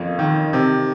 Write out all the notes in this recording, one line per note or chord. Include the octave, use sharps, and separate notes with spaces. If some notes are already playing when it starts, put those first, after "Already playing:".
Already playing: F2 A#3 C#4
D#3
C3